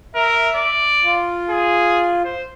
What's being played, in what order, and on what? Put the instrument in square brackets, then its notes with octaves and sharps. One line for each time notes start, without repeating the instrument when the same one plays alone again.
[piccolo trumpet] A#4 [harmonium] E5
[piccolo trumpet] D5
[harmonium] F4
[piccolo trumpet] G#4
C5